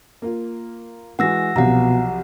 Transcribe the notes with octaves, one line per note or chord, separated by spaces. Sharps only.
A#3 F4
E3 G#3 F#4 F#5 E6 A#6
C2 B2 F3 F#3 F#5 A#5